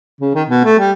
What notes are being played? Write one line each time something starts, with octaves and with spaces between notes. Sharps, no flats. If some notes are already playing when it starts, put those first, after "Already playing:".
C#3
D#3
B2
A3
G3